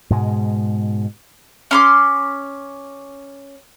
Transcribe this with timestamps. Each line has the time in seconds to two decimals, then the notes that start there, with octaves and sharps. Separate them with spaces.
0.10 G#2 B2 G#3
1.71 C#4 C6 D6